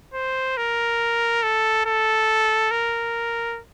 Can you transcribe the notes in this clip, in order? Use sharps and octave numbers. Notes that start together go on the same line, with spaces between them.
C5
A#4
A4
A4
A#4